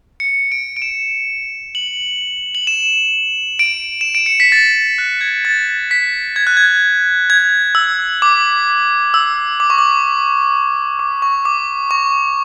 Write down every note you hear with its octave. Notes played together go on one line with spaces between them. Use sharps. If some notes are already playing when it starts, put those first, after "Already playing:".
C#7
D7
D7
E7
F#7
F#7
E7
D7
E7
D7
C#7
B6
A6
F#6
G#6
A6
B6
G#6
F#6
G#6
G#6
E6
D6
E6
D6
C#6
D6
D6
C#6
D6
C#6